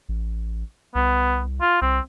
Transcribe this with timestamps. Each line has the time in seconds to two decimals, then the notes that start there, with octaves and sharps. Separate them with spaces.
0.09 A1
0.95 C2 B3
1.61 F4
1.82 C2 C4